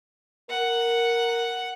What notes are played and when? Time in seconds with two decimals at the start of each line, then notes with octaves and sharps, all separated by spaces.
0.50 A#4 F#5